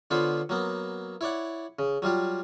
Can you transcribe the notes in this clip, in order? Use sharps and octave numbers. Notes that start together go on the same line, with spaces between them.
D3 B3 F4 C5 C#5 B5
F#3 A#3 B3
E4 C#5 D5 F#5
C#3
F#3 G3 F4 G4